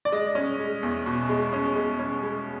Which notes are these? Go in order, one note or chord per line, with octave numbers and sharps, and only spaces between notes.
D5
G#3 D#5
C#4
G#3
E2
B2
G#3
C#4
G#3
C#4
G#3